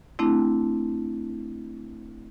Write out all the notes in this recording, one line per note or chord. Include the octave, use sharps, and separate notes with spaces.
A3 C4 D4 E4